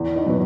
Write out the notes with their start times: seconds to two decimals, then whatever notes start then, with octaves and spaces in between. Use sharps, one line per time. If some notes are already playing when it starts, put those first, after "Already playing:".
Already playing: E2
0.15 D#4
0.26 B2 F#3 B4